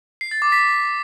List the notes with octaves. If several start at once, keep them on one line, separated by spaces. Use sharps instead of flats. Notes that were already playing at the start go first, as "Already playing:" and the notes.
C7
A6
D6
B6